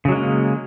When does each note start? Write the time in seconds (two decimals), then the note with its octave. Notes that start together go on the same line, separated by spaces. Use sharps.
0.05 C#3
0.08 F#3
0.12 G#3
0.15 A#3